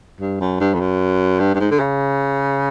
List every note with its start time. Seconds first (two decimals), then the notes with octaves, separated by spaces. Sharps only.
0.20 G2
0.40 F#2
0.60 G2
0.74 F2
0.80 F#2
1.40 G2
1.54 G2
1.60 G#2
1.71 D3
1.79 C#3